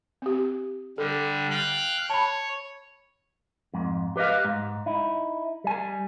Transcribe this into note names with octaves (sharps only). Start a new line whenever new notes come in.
C4 G4
D3 G3 A4
F5 G5 F#6
C#5 A5 B5
F2 G#2
G4 B4 D5 D#5 F5
G#2
D#4 E4
G3 G#5